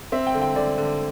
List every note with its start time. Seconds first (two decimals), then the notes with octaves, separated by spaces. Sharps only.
0.12 C4 E5
0.27 G5
0.34 D3
0.42 G5
0.56 D3 D5
0.78 D3